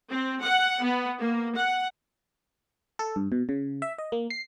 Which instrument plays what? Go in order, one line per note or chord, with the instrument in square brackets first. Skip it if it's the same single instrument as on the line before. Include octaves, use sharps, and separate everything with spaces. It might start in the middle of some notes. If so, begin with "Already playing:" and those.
[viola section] C4
F#5
B3
A#3
F#5
[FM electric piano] A4
G2
B2
C#3
E5
D#5
A#3
C7